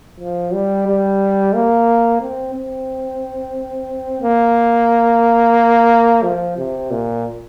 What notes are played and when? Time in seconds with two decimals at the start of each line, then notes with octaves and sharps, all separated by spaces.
0.20 F3
0.53 G3
0.87 G3
1.54 A#3
2.22 C4
2.55 C4
4.22 A#3
6.23 F3
6.58 C3
6.91 A#2